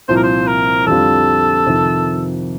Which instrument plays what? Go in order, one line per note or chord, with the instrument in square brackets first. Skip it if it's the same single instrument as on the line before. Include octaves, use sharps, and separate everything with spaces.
[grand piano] C2 A#2 F3 C4 [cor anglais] C5
[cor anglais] A#4
C5
A#4
[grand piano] F2 D3 G3 C4 F4 [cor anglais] A4
[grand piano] F2 C3 D#3